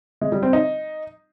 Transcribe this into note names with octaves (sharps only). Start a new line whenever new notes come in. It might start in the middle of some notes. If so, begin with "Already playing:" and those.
G#3
G3
C4
D#4